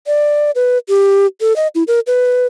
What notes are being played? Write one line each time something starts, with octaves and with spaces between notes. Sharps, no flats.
D5
B4
G4
A4
D#5
E4
A#4
B4